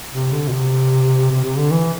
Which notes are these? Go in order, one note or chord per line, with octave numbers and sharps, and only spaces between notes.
C3
D3
B2
C3
C3
C3
D3
E3